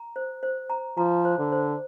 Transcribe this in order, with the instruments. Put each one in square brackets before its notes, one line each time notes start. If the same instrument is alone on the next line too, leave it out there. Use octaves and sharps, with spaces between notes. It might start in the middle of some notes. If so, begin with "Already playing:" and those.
Already playing: [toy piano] A#5
C5
C5
A#5
[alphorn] F3 [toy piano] A#5
[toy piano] C5
[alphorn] D3
[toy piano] C5